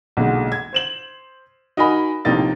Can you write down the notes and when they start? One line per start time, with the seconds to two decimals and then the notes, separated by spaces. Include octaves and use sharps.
0.17 B1 A#2 D3 G#3
0.52 G#6
0.73 C5 E7 F#7
1.77 D#4 F#4 A#4 D#5 G#5 B5
2.25 A#1 A2 C3 A#3 D#4 A6